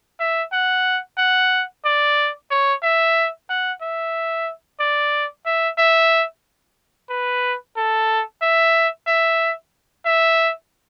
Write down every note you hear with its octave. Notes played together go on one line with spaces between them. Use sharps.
E5
F#5
F#5
D5
C#5
E5
F#5
E5
D5
E5
E5
B4
A4
E5
E5
E5